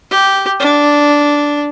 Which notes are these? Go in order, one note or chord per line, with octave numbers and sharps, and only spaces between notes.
G4
D4